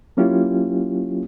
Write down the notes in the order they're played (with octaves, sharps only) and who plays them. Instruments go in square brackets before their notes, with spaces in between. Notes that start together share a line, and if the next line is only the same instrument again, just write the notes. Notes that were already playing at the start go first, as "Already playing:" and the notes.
[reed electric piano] F#3 A#3 C#4 E4 F4 G4